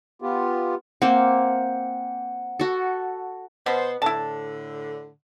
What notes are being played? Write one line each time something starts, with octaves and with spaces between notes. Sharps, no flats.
B3 F4 G4
A#3 C4 F#5
F#4 A4
B2 B3 C5
A2 D3 E4 A5